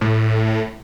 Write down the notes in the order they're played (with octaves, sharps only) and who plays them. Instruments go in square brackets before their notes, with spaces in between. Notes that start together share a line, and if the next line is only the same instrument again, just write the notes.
[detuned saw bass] A2